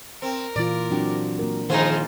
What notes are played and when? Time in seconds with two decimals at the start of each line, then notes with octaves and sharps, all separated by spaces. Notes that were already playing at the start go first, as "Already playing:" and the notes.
0.22 C4 A#4
0.56 A#2 E3 F4 D5
0.91 F#3 C4 D4 F#4 G4
1.39 A#3 A#4
1.70 G#2 D#3 F3 D#4 F4 G#4 C5